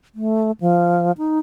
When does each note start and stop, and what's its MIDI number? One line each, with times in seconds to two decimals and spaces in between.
0.15 0.51 57
0.61 1.12 53
1.18 1.39 63